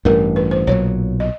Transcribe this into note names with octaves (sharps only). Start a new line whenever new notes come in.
A1 G2 E3 A#4
B4
C5
B1 A#2 F#3 C#5
D#5